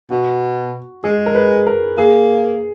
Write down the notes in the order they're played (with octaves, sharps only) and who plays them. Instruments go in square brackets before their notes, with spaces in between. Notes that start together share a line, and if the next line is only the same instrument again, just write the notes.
[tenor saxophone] B2 [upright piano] F#4
[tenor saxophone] G#3 [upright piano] G#4
[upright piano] A#4
B4
A#4
[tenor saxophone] A#3 [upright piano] G#4